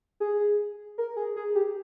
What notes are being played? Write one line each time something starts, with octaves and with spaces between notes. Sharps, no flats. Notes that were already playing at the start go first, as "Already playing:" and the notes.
G#4
A#4
G#4
G#4
G4